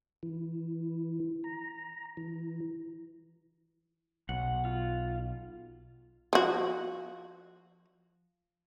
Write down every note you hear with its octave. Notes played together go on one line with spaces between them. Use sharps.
E3
A#5
E3
B1 F#5
F4
F3 F#4